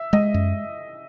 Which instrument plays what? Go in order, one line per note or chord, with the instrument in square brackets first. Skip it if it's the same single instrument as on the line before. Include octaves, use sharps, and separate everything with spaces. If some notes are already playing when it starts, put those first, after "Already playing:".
Already playing: [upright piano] E5
[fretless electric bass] G#3 [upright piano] D#5
[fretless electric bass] F#2